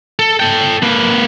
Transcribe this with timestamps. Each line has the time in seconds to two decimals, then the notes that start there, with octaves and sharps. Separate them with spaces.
0.19 A4
0.40 A4 G5
0.83 A#3 B4